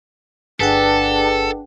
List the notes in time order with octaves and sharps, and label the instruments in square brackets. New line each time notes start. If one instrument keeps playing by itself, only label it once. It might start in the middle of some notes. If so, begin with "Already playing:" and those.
[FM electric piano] G1 G#4 F#5 [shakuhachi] D4 [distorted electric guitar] A4 [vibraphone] B4 G5